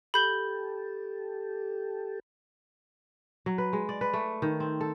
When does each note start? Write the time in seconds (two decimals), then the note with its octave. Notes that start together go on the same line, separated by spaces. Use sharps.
0.14 G4 A4 B5 G6 G7
3.46 F#3
3.58 B4
3.73 G#3
3.89 D5
4.01 B4
4.13 A3
4.42 D#3
4.60 C4
4.81 A4